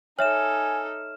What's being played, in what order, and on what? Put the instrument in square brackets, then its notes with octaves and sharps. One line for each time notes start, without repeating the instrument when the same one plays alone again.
[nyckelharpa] D#4 A4 [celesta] C#5 E5 [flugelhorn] G#5 [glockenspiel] F6 E7